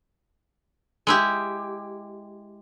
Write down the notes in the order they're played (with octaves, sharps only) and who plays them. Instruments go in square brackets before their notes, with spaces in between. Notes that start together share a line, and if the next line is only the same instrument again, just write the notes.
[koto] G#3 E4 G4